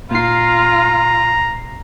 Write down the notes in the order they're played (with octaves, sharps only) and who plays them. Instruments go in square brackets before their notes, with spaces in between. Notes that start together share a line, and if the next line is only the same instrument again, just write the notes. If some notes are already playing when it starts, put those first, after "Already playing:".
[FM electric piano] A#2 C7 [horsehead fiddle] F4 [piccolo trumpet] A#5